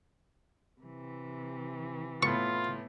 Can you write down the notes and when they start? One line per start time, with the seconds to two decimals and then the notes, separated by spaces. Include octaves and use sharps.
0.81 C3 E3
2.23 A2 B3 F4 C#6